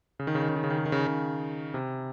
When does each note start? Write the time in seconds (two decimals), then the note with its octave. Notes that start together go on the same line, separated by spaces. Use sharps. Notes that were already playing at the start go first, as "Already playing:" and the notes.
0.19 C#3
0.27 D#3
0.35 C#3
0.42 D#3
0.49 C#3
0.56 D#3
0.64 C#3
0.71 D#3
0.78 C#3
0.86 D#3
0.92 C#3
0.99 D#3
1.07 C#3
1.74 C3